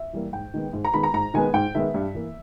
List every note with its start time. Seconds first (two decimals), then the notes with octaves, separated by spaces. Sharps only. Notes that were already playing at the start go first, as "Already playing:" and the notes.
Already playing: E5
0.13 E3 G3 A#3
0.33 G#2 G5
0.54 D#3 G#3 B3
0.73 G#2
0.85 A#5
0.94 D#3 G#3 B3 B5
1.03 A#5
1.14 G#2 A#5
1.34 D#3 G#3 B3 G#5
1.54 G#2 G5
1.75 D#3 G#3 B3 E5
1.94 G2
2.14 E3 A#3